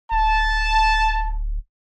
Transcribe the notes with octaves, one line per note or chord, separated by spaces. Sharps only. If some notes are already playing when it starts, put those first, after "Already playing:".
D1 A5